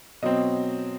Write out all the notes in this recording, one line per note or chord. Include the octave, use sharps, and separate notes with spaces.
B2 F#3 C4 D#5